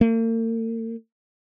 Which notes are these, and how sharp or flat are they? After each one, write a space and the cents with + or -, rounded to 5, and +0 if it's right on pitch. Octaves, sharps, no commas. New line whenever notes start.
A#3 -45